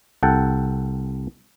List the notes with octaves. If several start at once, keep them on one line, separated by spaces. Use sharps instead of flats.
C2 A4 F#5 G5 A5